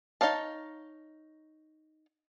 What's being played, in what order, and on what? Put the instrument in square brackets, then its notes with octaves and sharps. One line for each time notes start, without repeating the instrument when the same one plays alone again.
[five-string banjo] D#4 C#5 F5 A5